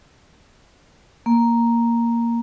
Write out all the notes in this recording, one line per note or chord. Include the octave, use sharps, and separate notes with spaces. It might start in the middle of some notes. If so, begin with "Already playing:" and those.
A#3